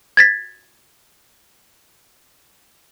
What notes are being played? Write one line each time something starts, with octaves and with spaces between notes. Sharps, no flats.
G#6 A6 B6